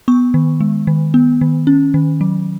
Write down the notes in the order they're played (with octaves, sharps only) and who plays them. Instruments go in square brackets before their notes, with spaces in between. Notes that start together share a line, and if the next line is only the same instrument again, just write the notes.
[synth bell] B3 C#6
D#3
G#3
D#3
B3
D#3
C#4
D#3
F#3